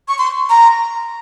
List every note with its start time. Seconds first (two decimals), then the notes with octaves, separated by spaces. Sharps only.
0.08 C#6
0.19 C6
0.50 A#5